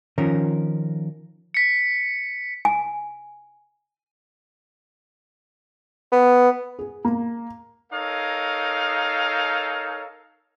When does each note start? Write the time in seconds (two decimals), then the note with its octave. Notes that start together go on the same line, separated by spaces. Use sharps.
0.18 D#3 F3 C#4 A#4
1.54 B6 C#7
2.65 G#5
6.12 B3
6.79 G#4
7.05 A#3
7.92 D#4 A4 A#4 C#5 F5